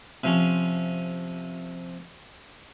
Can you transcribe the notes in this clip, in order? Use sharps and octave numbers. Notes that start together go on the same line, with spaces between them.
C3 F3 C#4